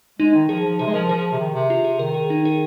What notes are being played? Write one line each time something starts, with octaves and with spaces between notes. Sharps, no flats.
G#3 D#4
D#3
F3 G#4
F3
C3 G#4
G#3
F3 A#4
F3 G#4
C3
D#3
C3
F4
G#4
D#3 A#4
G#4
D#4
G#4